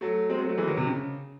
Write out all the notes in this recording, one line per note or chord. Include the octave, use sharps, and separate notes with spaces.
F#3 A3
G#3 C4
F#3 A3
F#3 A3
E3 G#3
D#3 F#3
C3
C#3